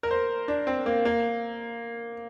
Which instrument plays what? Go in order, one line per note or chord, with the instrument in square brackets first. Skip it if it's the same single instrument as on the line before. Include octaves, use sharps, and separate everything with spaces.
[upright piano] A#4
C5
D4
C4
A#3
A#3